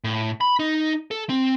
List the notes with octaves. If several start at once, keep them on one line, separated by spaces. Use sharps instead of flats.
A2
B5
D#4
A4
C4